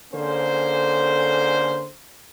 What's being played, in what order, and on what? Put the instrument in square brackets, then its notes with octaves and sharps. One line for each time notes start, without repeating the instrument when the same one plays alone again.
[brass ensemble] D3 A#3 C#4 G#4 A4 C5